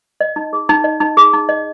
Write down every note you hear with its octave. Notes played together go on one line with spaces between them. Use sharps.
D#5
D#4
G#4
D#4
D#5
D#4
G#4
D#4
D#5